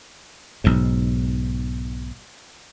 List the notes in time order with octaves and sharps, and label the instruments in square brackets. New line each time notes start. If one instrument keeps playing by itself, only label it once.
[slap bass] B1 G#2